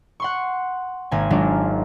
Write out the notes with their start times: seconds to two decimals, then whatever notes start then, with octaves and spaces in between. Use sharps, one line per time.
0.20 F#5 C6 C#6
1.11 G#1 A#3 G#5
1.30 D#3 F#3 G#3 A#3 D4 F4